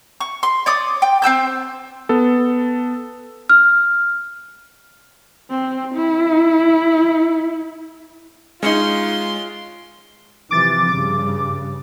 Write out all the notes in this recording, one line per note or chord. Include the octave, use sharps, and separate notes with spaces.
C#6
C6
C#5 D5 D6 D#6
G5
C4 G4 E6 G6
B3 A4
F6
C4
E4
G#3 C#4 D#4 F4 C6
C3 E3 F3 D6 A6
G2 C#3 D6